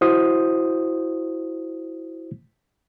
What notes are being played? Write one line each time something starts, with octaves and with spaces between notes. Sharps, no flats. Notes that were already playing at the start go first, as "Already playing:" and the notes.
E4 F#4 C5 D#6